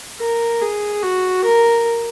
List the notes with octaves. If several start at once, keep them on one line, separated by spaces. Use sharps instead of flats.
A#4
G#4
F#4
A#4